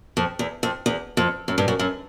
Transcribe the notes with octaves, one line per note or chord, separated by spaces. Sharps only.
F2
E2
F2
E2
F2
F#2
G2
F#2
F#2